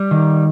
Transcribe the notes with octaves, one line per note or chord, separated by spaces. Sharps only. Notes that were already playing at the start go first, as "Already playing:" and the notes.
Already playing: G3
D#3